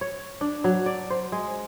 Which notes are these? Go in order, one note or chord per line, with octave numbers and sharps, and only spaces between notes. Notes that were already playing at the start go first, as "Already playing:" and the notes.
C#5
D4
F#3
D5
C5
G#3